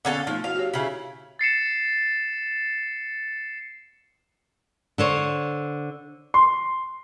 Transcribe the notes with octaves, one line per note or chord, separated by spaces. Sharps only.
D3 B3 C#4 A4 F5 D6
F3 A3 D#4
E4 F#4 F5
F#4 G4 C#5
C#3 E4
A6 C7 C#7 E7
D3 C5 C#5
C6